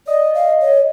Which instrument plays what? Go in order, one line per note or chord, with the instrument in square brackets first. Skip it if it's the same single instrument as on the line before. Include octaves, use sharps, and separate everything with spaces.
[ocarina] D5 [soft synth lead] D#5
[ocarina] F5
C#5